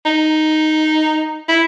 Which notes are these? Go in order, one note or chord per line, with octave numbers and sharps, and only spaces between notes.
D#4
E4